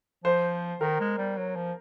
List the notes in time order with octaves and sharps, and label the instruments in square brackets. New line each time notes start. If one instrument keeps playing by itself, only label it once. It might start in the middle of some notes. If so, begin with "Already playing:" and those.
[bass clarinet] F3 [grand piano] C5
[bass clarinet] D#3 [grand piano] A#4
[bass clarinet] G#3
G3
F#3
F3